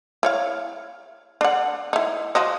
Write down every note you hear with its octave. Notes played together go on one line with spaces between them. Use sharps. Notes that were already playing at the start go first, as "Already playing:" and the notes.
E4 C#5 F5
D4 F#5
D#4 E4
F3 F#4 D#5